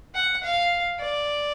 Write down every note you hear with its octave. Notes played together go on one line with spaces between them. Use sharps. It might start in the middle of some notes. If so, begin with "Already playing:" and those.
F#5
F5
D5